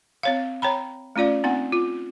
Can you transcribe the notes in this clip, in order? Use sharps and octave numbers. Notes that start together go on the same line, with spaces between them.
C4 C#5 F5
C#5 G5 A#5 B5
A3 C#4 F4 D5 F5
B3 C4 D#4 F#5
F4